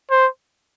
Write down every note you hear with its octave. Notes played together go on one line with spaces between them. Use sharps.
C5